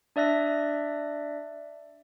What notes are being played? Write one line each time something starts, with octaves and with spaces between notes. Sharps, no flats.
D4 D5 E5 F#6 A#6